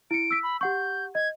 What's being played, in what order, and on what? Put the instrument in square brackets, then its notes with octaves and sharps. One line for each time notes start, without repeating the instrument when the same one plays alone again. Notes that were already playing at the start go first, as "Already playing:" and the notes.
[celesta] E4 C#7 [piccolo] D7
[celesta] E6 B6
[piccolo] B5
[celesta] G4 F#5 C#6 [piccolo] G6
[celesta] D#5 [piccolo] G#6